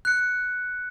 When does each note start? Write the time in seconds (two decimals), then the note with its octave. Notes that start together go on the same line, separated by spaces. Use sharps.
0.05 F#6 C#7